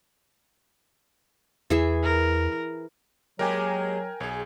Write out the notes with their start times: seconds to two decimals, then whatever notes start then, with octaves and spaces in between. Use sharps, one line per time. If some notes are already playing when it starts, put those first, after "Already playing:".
1.70 E2 E3 G#4 E5
2.04 A#4
3.39 F#3 G#3 A#3 G4 A#4 G5 G#5
4.20 B1 G#4 C#5